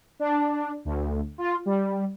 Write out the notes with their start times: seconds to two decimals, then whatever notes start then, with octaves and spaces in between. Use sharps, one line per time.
0.20 D4
0.85 D2
1.38 F4
1.66 G3